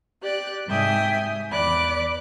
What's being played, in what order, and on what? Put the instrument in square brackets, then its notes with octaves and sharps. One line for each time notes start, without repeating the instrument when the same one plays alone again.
[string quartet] G4 D5 F#6
G#2 C3 E5 G5 G#5 D#6
E2 D5 B5 D6 F#6